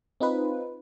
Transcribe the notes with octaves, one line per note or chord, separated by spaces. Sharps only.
C4 D#4 F4 B4